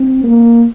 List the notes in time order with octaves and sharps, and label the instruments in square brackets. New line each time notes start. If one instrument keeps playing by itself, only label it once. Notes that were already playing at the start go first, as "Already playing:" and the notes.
Already playing: [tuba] C4
A#3